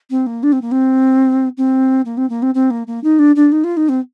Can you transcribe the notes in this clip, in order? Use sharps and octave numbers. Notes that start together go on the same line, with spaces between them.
C4
A#3
D4
C4
A#3
C4
C4
A#3
C4
A#3
C4
C4
A#3
A#3
D#4
D4
D4
D#4
F4
D#4
C4